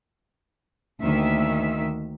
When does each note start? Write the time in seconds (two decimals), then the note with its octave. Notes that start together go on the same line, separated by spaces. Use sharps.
1.01 D2 D#3 A#3 E5